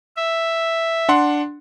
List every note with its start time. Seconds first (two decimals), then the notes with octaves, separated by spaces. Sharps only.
0.16 E5
1.09 D4 F#5 C6